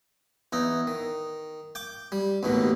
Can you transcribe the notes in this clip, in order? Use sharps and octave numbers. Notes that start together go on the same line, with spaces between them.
E2 D#4
D#3
G5 D6
G3
A1 D#2 B2 D#3